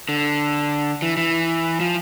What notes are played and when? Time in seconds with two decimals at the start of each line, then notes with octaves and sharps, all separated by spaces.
0.09 D3
1.02 E3
1.17 E3
1.80 F3